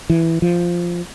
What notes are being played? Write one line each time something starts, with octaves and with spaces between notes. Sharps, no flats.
E3
F3